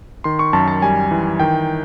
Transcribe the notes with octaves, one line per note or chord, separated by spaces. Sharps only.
D#3 C6
C#6
F#2 A5
A5
G3 G#5
E3
D#3 G5